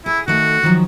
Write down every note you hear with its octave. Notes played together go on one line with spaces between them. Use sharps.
E4 G#4
D#3 A3 F#4
D#3 F3 F#3